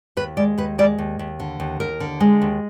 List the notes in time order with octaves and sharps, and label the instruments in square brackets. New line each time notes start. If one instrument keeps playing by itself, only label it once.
[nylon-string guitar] D#2 B4
G#3 D5
D#2 B4
G#3 D5
D#2
D#2
D3
D#2
D#2 A#4
D3
G#3
D#2